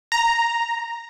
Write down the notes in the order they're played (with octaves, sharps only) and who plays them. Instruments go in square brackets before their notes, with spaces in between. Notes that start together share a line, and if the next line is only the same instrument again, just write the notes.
[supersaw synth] A#5